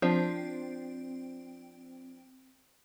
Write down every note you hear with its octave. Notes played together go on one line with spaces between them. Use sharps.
F3 C4 D4